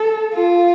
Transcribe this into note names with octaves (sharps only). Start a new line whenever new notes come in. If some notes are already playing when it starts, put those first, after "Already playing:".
Already playing: A4
F4